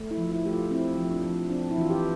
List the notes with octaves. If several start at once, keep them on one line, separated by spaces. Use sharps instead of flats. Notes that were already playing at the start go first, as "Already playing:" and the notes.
Already playing: A3
E4
F3
E4
A3 G4
F4
C4 E4
F3
D4
F3
C4 D4
E4
E3 F4
G4